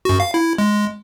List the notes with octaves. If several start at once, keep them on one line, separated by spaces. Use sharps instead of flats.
F#2 F#4
F5
E4
G#3